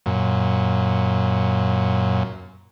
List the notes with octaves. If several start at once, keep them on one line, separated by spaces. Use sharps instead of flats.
F#2 A#2